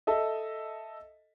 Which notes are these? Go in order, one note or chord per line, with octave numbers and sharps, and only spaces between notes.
A4 D#5 E5